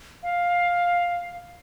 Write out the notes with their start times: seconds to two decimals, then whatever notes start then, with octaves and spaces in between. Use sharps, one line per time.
0.23 F5